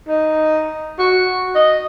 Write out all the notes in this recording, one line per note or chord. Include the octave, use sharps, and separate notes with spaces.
D#4
F#4
D#5